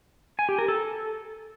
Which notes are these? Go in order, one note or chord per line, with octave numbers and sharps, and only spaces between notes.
G#5
G4
A#4
A4